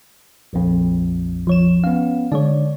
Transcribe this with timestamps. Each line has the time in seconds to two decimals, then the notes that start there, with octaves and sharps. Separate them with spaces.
0.53 A#1 F2
1.47 F3 C#5 E7
1.84 B3 C#4 F5
2.32 D3 G#3 C#5 D5